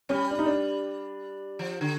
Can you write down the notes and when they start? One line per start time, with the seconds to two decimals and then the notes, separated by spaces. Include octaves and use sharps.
0.09 G3 C#4
0.31 D4
0.39 D#4
0.46 D4
1.59 F3
1.81 D3